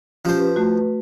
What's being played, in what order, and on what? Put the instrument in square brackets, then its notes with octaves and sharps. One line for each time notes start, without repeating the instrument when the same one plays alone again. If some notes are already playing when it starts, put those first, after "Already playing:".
[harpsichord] F3 C5 [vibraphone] C#4 G4
[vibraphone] B4
[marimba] A3 F#4